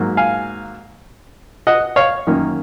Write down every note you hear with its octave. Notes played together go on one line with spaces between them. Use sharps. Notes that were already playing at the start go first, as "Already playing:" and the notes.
Already playing: G#2 F#3 A#3
F5 G#5
D#5 F#5
C#5 F5
F#2 D#3 A#3 C#4